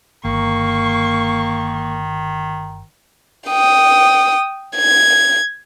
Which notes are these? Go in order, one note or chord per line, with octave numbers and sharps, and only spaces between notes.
G1 D#3 A#3 C#6
G5 D#6
G#6